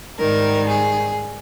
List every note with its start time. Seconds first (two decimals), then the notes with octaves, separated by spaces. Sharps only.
0.19 G#2 D#3 G3 A#4
0.69 G#4